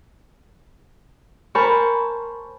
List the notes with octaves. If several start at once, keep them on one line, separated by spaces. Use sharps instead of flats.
A#4 C5 G#5 A5 B5 C#6